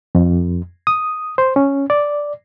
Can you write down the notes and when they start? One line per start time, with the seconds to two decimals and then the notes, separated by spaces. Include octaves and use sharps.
0.15 F2
0.87 D#6
1.38 C5
1.56 C#4
1.90 D5